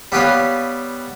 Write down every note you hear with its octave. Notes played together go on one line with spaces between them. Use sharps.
G3 B3 G4 B4 C#5 F5